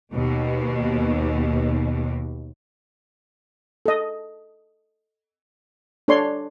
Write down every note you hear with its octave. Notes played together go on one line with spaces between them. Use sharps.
D#2 B2
A4 D#5
D4 A4 C#5 D5 C6